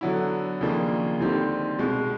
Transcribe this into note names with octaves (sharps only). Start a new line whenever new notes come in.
D3 F#3 B3 E4
D#2 C#3 F3 A#3 D4
D#2 D3 G3 C4 D#4
C2 B2 G#3